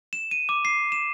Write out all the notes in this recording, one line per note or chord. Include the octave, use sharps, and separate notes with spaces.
E7
D#7
D6
C7
E7